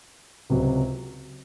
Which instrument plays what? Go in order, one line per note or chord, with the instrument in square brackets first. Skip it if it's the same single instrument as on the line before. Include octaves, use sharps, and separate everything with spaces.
[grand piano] C#2 C3 F#3